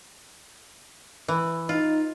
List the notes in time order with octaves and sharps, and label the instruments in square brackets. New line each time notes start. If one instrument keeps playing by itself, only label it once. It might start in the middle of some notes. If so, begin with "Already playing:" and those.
[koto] E3
[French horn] D#4 [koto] F4